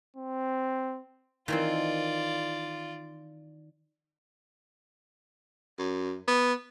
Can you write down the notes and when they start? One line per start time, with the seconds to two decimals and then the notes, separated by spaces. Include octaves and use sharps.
0.16 C4
1.48 D#3 E3 C4 F4 D5
5.79 F#2
6.28 B3